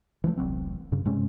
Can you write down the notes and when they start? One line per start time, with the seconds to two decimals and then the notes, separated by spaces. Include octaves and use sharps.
0.24 E3 F3 G#3 A3
0.37 E1 C2 F#3 C4
0.92 G2 C#3
1.05 G2 C3 G#3 C#4